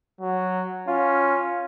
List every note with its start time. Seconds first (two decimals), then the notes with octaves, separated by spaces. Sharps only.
0.21 F#3
0.88 C#4 F4